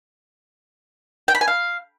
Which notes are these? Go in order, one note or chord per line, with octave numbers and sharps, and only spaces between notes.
G5
B5
G#5
F5